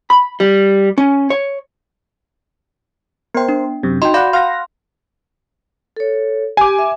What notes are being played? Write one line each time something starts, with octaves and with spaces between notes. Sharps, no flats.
B5
G3
C#4
C#5
B3 A#4 C5 G5
D4
F#2 C3
D#4 F#4 G5 C6
D5 F5 F#5 B5 G6
F5 F#5 C6 A#6
A4 C#5
G4 G#5 D6
E5